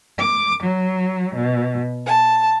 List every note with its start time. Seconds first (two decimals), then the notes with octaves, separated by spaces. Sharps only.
0.19 D6
0.64 F#3
1.35 B2
2.06 A5